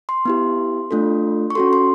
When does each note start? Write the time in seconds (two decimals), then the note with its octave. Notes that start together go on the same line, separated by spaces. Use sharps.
0.09 C6
0.25 B3 E4 G4
0.91 A3 D4 F4 A4
1.50 C#6
1.55 C#4 F#4 A4 C6
1.73 C6